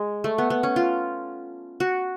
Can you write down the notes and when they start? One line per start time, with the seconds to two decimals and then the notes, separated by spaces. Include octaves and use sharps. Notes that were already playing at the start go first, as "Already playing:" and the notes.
Already playing: G#3
0.24 A3
0.38 B3
0.50 B3
0.63 C#4
0.76 F4
1.80 F#4